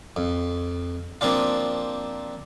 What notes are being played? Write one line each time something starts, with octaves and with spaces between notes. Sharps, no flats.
F2
F3 A#3 C4 D4 F4